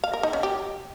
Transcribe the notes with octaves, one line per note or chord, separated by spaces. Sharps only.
F5
A#4
D#4
C#4
G4